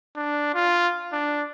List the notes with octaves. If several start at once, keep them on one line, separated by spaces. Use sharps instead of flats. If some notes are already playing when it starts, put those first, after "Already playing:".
D4
F4
D4